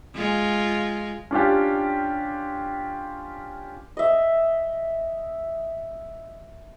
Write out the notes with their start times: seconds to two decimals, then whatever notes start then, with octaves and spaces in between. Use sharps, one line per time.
0.15 G#3 F4
1.31 C#4 D4 F4 G4
3.97 D#5 E5